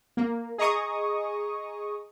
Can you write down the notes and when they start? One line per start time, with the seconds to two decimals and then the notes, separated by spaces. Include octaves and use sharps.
0.17 A#3
0.58 G#4 D#5 A#5 C#6 D#6